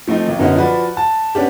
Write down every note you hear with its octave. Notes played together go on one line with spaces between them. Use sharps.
F3 A3 C4 D#4
B1 D#3
F#2 B2 D3 B3 C#4 D#4
F3 F#4 B4 D5
A5
B3 C#4 D4 G4